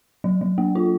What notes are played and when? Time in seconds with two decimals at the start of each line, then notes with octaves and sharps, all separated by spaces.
0.24 F#3
0.41 F#3
0.58 A#3
0.75 F4